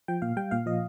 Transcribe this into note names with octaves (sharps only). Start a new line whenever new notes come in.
F3 G5
A#2 F5
G3 G5
A#2 F5
F3 D#5